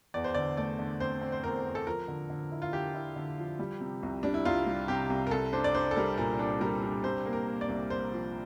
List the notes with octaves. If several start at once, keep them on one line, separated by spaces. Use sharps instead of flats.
E2 D5
C5
D3 D5
A3 D5
D3
C4 C5
C4
C5
E2 A#4
E2
A4
F3 A#4
D3
D3
E4
F4
D3 G4
E4
D3
F3
G3
C3
C2
G3 D4
E4
C2 F4
G3
C3 G4
C2
A#4
C2 A4
D4 C5
D5
D4 C5
A4
G3 A#4
A#2 A#4
D4
G3 A#4
D4
C3 C5
A#3
A#4
A#3
D5
C2
A#3 C5
F3